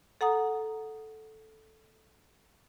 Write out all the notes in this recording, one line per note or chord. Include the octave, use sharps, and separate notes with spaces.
A4 F#5 A#5 D#6